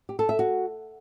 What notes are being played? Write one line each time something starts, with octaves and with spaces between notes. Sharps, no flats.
G4
A4
E5
F#4